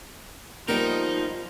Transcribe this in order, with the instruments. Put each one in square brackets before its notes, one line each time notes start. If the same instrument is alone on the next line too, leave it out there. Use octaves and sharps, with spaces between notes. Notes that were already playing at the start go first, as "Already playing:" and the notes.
[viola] F3 [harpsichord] G3 B3 A#4 [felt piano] A#3 [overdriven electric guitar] D#4